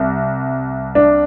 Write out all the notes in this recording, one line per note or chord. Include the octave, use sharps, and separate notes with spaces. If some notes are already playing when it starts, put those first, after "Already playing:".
Already playing: C2
D4